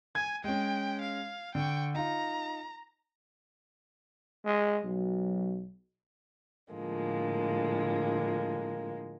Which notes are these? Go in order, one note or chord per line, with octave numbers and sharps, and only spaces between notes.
G#5 G#6
G#3 C#4 G5
F5
D3 G5 C#6
D#4 F4 A#5
G#3
B1 F#3
A2 D3 F3 G#3 A#3